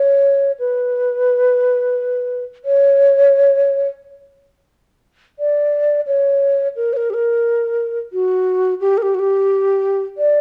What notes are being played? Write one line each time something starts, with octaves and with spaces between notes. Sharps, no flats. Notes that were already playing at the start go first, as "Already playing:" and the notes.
Already playing: C#5
B4
C#5
D5
C#5
A#4
C#5
A#4
G4
A#4
F#4
G4
A#4
G4
F#4
G4
D5